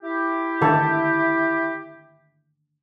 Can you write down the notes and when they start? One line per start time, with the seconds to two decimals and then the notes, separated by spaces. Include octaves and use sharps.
0.03 E4 G4
0.61 D3 D#3 A4